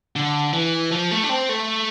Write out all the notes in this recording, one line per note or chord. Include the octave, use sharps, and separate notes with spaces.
D3
E3
F3
A3
D4
C4
A3